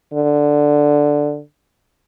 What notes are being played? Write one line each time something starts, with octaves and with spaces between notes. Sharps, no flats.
D3